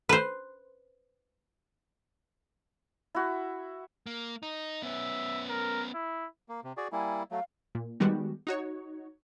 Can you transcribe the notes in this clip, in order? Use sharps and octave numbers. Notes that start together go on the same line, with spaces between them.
B4 C5
E4 F#4
A#3
D#4
B3 C#4 E5
A#4
E4
A#3
C3
F#4 G#4 D5
G3 A#3 E4 G#5
F#3 A3 F5
A#2
D#3 G3 G#3 B3 F#4 G4
D#4 F#4 C#5